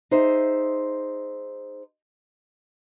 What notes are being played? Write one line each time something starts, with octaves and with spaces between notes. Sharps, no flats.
D#4 G#4 C5 E5